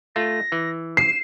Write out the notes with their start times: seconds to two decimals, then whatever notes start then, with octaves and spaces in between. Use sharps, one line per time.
0.16 A3 F4 A#6
0.52 E3
0.97 C7 E7